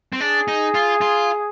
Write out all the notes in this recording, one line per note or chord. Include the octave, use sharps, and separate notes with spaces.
C4
D4 G#4
D#4
F4
F4